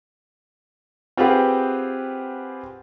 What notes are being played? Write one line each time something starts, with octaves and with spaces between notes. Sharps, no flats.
C4 F4 G4 G#4 B4 F#5